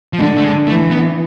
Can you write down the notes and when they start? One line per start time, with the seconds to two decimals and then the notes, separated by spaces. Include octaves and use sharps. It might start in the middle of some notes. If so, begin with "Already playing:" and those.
0.13 F3
0.19 D3 G#3
0.37 A3
0.44 G#3
0.67 E3 A3
0.91 B3